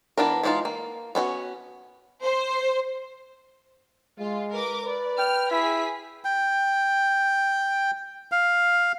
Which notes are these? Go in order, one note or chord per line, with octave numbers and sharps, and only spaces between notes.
E3 B3 D4 A#4
E3 G#3 D4 D#4 F4
A#3
B3 C#4 E4 F#4
C5
G#3 F4
A#4 B4 D6
B4 D5
G5 F6
E4 G#4 B6
G5
F5